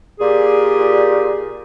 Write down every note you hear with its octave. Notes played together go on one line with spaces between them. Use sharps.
A#2 G4 G#4